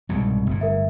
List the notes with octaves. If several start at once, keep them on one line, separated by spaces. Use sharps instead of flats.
C2 G#2 B2
G1 A2
A#4 E5